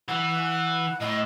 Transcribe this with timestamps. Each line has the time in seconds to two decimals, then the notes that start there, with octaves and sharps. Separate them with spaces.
0.08 E3 F#5
1.00 A2 D#5